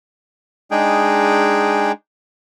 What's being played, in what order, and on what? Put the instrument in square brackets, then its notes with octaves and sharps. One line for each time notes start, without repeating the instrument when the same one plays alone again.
[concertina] G#3 D4 D#4 G#4 G5